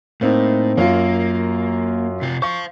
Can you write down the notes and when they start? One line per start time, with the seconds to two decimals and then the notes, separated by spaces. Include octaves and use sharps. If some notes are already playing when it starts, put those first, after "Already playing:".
0.21 A2 A#3 C4 D#4
0.78 F#2 A#3 F4
2.22 C3 F4
2.42 C5 F5 C#6